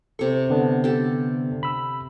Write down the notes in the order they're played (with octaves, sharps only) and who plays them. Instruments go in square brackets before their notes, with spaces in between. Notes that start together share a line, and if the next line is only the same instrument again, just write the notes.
[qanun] C3 C#6 [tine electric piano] A4
[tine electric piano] D3 B3 D4
[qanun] G4 A4
[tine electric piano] B5 E6